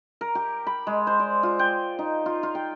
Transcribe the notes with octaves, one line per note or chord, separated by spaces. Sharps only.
A#4
G4
B5
G#3
C5
D5
F4
G5
D#4
F4
F4
G5